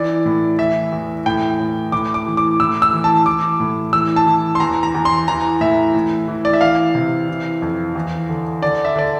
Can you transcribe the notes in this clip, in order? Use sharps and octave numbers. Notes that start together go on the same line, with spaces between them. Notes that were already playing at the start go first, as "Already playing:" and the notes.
Already playing: E3 D5
A2
E3 E5
E2
A2 G5
A2
A2 D6
D6
E3
D6
A2 E6
E6
E3
A5
E3 D6
A2
E3 E6
A5
E3
C6
E2 A#5
A#5
E2
C6
E3 A#5
A2 E5
A2
E3
D5
E5
E3 F5
C3
E3
F2
E2
D3
D3 D5
E5
D3 D5